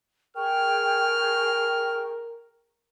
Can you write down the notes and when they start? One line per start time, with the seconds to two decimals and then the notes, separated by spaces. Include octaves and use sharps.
0.36 G#4 A#4 G5 C#6 F6